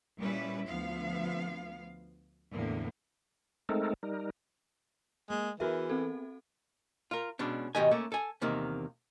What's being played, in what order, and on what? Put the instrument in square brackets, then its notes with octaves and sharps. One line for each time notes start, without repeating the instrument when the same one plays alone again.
[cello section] A#2 G3 C#4 E4 B4
D2 F3 B3 F5
E2 A2 D3 A#3
[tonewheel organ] G#3 A3 C4 D#4 A4 A#4
G3 D#4 A#4
[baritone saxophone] G#3 [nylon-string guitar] A#3
[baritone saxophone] E3 [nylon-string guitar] B3 G#4 A#4 [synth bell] F#4 E5
[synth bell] C4 A4
[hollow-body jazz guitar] F4 A#4
B2 G#3 C#4 D4
G#2 B2 D#3 G4 D#5 G#5
A3 A#3 C#4
A4 G#5
E2 C3 D#3 A#3